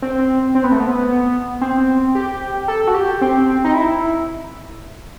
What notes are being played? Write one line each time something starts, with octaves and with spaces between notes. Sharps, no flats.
C4
C4
B3
A3
B3
C4
G4
A4
F#4
G4
C4
D#4
E4